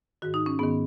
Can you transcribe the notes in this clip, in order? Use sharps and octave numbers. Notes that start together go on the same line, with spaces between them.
G#2 D#3 F#4
D#4
C#4
G#2 D#3 B3